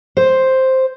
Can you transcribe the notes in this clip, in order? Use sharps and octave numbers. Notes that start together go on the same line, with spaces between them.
C5